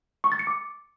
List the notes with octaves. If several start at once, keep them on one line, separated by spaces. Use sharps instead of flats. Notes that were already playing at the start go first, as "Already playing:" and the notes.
C#6
A6
C#7
D6